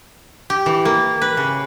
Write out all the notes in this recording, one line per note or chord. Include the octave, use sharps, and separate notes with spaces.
G4
E3
A#3
B4
C#3